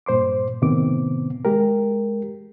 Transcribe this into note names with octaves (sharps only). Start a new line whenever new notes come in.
G2 A#2 C5 C6 D6
A2 C3 D#3 B3 C4 D6
G#3 G4 A#4